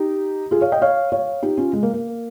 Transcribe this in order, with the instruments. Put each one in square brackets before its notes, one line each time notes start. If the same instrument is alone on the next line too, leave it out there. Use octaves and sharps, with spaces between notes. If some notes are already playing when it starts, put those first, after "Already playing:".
Already playing: [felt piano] D#4 G4
F4 G#4
C#5 F5
D#5 G5
C#5 F5
C#5 F5
D#4 G4
C#4 F4
G#3
A#3
A#3